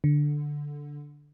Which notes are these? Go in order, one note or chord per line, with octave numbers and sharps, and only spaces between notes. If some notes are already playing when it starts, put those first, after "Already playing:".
D3